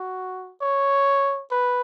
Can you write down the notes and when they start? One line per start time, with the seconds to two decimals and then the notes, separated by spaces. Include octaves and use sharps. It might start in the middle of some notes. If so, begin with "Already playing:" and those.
Already playing: F#4
0.61 C#5
1.51 B4